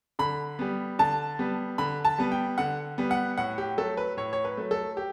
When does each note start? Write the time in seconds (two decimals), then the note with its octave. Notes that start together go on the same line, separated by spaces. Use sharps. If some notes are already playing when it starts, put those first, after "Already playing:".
0.19 D3 B5
0.59 G3 B3
0.99 D3 A5
1.39 G3 B3
1.78 D3 B5
2.05 A5
2.18 G3 B3
2.32 G5
2.58 D3 F#5
2.98 G3 B3
3.11 F#5
3.38 A2 F#5
3.58 G4
3.78 F#3 A3 A4
3.97 B4
4.17 A2 C#5
4.33 C#5
4.45 B4
4.57 F#3 A3
4.71 A4
4.97 G4